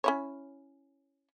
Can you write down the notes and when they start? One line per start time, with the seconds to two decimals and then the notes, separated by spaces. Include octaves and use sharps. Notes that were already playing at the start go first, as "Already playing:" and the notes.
0.04 C#4 E4 C#5